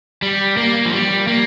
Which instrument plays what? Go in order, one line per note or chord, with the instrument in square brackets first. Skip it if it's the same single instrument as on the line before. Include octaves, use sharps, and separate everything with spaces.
[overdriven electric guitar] G3
A#3
F3
G3
A#3